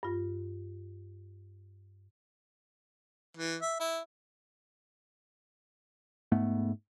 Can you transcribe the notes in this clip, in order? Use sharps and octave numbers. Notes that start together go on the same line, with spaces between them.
G2 F4
E3
E5
E4
G#2 A3 B3